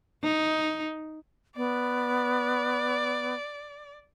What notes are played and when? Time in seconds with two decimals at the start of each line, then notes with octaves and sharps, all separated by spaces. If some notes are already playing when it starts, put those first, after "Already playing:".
0.23 D#4
1.56 B3 D5